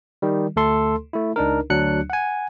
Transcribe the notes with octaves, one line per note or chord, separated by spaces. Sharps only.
D#3 G3
D2 A3 A4 C6
A3 E4
C#2 D4 D#4 A#4
D2 F#3 D4 F#6 C#7
F#5 G#5